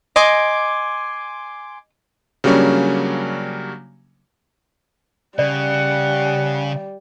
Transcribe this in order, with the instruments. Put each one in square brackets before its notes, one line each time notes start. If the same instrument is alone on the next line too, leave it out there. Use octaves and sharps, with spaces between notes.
[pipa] D#5 [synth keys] G#5 C6 D6
[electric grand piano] C#3 F#3 G3 A#3 C#4 D4
[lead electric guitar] C#3 [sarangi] G3 [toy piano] D5 [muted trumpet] F#5